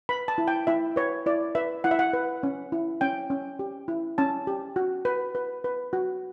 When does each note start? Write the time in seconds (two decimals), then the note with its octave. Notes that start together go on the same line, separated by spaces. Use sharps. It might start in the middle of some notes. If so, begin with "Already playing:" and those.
0.09 B4 B5
0.28 A5
0.38 E4
0.48 G5
0.67 E4 E5
0.96 B4 C#5
1.26 E4 D5
1.55 B4 E5
1.84 E4 F#5
1.91 E5
1.99 F#5
2.13 B4
2.43 C#4
2.72 E4
3.01 C#4 G5
3.30 C#4
3.59 G4
3.88 E4
4.18 C#4 A5
4.47 G4
4.76 F#4
5.05 B4
5.35 B4
5.64 B4
5.93 F#4